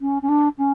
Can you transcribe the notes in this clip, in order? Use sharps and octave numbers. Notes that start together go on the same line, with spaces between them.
C#4
C#4
D4
C#4